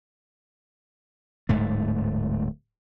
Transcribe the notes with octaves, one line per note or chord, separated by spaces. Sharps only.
D1 G#2 A3